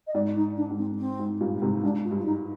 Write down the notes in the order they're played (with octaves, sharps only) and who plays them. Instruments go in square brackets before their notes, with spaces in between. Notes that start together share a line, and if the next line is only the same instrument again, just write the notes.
[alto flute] D#5
[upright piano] G#2 [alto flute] D5
[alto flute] D#4
D4
[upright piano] G#2
[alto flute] C4
C4
[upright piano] G#2
G2 A#2
G#2 C3
[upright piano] G#2 [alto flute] D4
[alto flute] F4
[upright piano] G2
[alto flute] F4
D#4